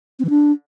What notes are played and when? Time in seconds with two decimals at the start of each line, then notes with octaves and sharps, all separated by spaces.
0.19 C4
0.24 E3
0.30 D4